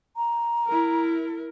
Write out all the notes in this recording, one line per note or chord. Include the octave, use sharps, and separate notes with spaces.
A#5
E4 A#4